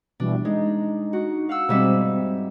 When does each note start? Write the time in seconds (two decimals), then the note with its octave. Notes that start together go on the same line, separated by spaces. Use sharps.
0.20 B2 E3 G3 D4
0.45 G#3 D#4
1.13 F#4
1.49 F5 F#5 E6
1.69 G#2 B2 G3 C4 E5